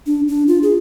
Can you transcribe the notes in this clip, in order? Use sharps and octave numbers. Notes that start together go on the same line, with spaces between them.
D4
D4
F4
G#4